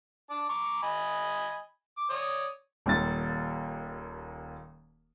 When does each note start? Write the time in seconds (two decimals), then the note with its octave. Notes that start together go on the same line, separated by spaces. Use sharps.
0.30 D4 A5 D6
0.49 A#5 C#6 D6
0.83 D#5 G#5 B5
1.98 D6
2.10 C#5 D5 D#6
2.86 D#1 D#2 A6